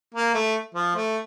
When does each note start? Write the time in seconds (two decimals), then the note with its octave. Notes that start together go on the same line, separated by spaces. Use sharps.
0.14 A#3
0.34 A3
0.74 F3
0.95 A3